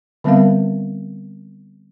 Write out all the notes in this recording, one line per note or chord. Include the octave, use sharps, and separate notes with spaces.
D3 G3 B3 C4 A#4 F5